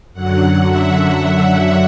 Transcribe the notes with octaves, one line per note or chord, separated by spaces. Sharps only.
F#2 D3 F#3 F#5
E5